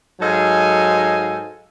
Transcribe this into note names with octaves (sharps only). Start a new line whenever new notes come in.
G#2 F#3 A4 D#5 F5 G#5